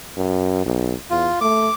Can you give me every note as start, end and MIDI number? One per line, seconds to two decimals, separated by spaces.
0.16 0.62 42
0.66 0.93 35
1.10 1.29 40
1.10 1.39 65
1.41 1.68 57
1.41 1.74 86